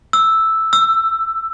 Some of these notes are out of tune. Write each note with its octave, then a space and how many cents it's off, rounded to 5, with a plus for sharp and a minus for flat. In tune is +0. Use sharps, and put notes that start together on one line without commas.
E6 +0
E6 +15